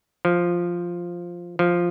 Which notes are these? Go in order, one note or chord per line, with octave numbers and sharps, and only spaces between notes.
F3
F3